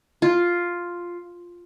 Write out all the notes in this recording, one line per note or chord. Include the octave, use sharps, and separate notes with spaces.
F4